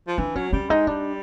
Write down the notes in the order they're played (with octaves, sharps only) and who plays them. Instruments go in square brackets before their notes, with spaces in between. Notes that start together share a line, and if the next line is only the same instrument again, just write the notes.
[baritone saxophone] F3
[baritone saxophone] E3 [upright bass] D4
[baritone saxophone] F#3 [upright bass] C#4
[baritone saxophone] G3 [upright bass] C#4
[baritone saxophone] G#3 [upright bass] D#4
[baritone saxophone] G3 [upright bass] D4